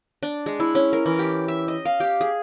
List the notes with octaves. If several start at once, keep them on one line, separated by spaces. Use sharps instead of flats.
D4
G#3
E4
C#4
A#4
E3
G4
E5
D#5
F5
G4
G#4